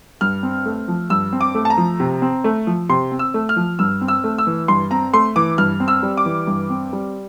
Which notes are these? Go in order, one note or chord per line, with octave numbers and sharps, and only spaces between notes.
G2 F6
C4
A3
F3
G2 E6
C4
D6
A3
A5
A#5
F3
C3
C4
A3
F3
C3 C6
C4
E6
A3
F6
F3
G2 E6
C4
E6
A3
E6
E3
G2 C6
C4 A#5
A3 C6
E3 D6
G2 F6
C4
E6
G3
D6
E3
G2
C4
G3